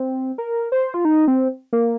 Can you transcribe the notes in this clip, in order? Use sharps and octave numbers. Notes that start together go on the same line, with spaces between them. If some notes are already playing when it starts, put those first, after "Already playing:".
Already playing: C4
A#4
C5
F4
D#4
C4
A#3